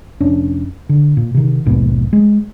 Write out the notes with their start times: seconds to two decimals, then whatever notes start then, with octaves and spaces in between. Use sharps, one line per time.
0.20 F1 C#4 D4
0.89 D3
1.17 A#2
1.35 C3 D#3
1.66 A#1 D#2 G#2 B2
2.13 G#3